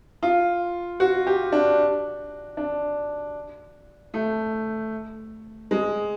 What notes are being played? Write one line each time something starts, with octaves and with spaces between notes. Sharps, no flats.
F4
F#4
G4
D4
D4
A3
G#3